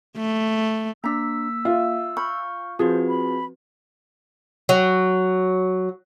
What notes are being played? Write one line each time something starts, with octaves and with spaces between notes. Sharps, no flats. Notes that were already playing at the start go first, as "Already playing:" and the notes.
A3
A#3 D4 A#5 E6 B6
F4 E5
B5 C#6 F6 G6
F3 C4 F#4 G#4 B4 C5
B5
F#3